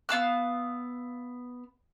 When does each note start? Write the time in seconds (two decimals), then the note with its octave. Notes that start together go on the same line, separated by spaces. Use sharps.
0.09 B3 F5 E6 F#6